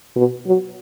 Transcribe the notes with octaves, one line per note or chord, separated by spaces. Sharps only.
B2
F#3